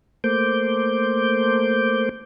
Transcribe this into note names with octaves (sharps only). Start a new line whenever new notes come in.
A3 A#3 C5 D6 G6